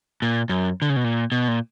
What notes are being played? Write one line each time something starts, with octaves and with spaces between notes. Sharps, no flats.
A#2
F#2
D3
C#3
B2
A#2
B2
A#2